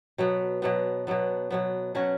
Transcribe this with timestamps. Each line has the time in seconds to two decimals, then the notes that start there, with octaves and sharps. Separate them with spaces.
0.18 B2 F#3 B3
0.62 B2 F#3 B3
1.07 B2 F#3 B3
1.51 B2 F#3 B3
1.95 B2 F#3 C#4 F#4